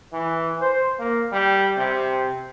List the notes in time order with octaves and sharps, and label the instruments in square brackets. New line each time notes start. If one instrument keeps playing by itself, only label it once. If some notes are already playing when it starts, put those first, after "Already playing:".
[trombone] E3
C5
A#3
G3
C3